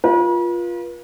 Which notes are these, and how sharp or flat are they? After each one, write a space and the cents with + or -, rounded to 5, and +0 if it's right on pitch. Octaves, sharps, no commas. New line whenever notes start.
F4 +0 B4 -45